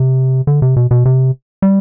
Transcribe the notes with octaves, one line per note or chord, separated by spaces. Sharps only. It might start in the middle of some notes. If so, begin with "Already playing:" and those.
Already playing: C3
D3
C3
B2
B2
C3
G3